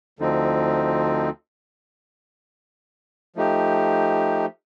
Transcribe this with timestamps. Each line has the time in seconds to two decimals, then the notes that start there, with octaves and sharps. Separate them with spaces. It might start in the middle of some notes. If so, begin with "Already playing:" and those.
0.19 D2 D3 F3 C4 D#4
3.36 F3 A3 D#4 G4